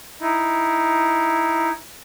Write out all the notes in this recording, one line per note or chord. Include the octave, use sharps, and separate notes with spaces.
D#4 E4